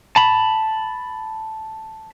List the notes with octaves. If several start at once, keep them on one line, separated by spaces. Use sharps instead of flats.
A5 B5